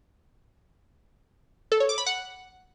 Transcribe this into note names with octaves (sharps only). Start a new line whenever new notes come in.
A4
C#5
D6
B5
F#5